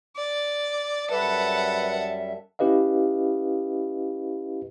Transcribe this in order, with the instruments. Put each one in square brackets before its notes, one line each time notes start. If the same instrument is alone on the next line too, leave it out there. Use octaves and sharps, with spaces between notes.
[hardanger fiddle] D5
[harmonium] F#2 G3 E5 [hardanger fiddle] A4 F#5 [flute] B4
[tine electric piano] C#4 E4 G4 B4 D#5 F5